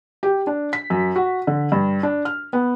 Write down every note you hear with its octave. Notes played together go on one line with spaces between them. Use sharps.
G4
D4
B6
F#2
F#4
D3
G2
D4
F6
B3